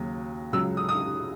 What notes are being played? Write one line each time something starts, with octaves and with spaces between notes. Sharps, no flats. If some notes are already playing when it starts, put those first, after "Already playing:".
Already playing: D#2 C#3 F#3
C#2 C#3 F#3 E6
D#6
D#6